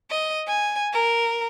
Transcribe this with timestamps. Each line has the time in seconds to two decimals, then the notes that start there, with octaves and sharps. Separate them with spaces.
0.11 D#5
0.48 G#5
0.93 A#4